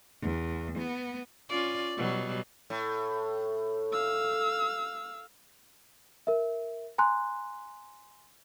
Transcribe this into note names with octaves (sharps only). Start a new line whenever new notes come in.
E2
B3
C#4 F4 D5
B2 F#3 G3
A2
F5 E6
A#4 E5
G#5 A#5 C6 F#6